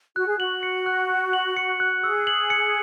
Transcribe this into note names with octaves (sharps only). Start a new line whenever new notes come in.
F#4 F#6
G#4
F#4 F#7
C#7
F#6
F#6
F#7
C#7
F#6
G#4 E6
F#7
C#7